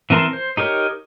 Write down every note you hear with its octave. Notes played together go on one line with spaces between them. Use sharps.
E3 C4 A#4 A5 C6
C5
D#4 G4 A#4 C#5